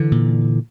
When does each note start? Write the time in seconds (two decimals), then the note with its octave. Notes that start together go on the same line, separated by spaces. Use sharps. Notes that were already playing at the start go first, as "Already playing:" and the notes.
Already playing: D3 E3
0.12 A#2